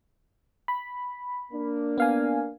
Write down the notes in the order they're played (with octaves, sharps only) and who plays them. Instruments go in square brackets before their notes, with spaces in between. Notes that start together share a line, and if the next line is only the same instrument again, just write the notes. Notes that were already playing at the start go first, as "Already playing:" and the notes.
[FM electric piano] B5
[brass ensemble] A#3 D4
[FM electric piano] B3 F5 G#5